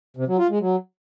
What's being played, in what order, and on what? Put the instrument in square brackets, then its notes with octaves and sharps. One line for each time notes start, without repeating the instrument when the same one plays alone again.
[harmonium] C3
F#3
F4
G#3
F#3